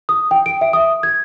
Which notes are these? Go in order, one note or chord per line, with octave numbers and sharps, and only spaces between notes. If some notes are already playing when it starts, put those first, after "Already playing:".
D#6
G5
D7
E5
D#6
G#6